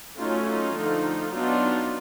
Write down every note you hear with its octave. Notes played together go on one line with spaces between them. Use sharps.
F#3 A3 C#4 D#4 F4
D#4 F4
D3 F3 A3
F#3 B3 D4 D#4 F4